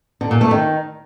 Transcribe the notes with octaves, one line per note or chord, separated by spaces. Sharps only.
D3
A#2
A3
D#3